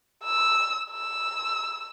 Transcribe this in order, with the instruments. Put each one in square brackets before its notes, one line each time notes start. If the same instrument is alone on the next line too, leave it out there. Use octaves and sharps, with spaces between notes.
[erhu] E6
E6